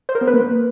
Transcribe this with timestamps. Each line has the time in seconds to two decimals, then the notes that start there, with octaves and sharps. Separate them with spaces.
0.09 C5
0.15 A#4
0.21 B3
0.27 B4
0.34 A#3